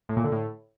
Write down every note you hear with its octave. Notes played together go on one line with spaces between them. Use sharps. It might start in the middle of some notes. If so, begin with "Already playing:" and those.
A2
A#2
D3
A2